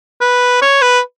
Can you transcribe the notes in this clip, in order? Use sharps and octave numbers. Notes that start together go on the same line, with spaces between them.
B4
C#5
B4